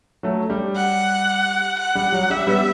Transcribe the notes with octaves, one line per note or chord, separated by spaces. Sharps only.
F#3 A3
G3
F#5
F#5
G3
F#3
G3 E5
G3 B3